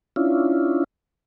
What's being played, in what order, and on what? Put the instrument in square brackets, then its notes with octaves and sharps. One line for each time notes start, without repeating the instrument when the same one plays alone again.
[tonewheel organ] C#4 D4 E4 F4